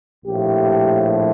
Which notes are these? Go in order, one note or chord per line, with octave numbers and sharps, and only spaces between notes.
A#1 A2 F3 G4